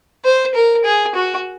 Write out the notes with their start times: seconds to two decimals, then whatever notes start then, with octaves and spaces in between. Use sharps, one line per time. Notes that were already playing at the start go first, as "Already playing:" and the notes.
0.24 C5
0.55 A#4
0.85 G#4
1.15 F#4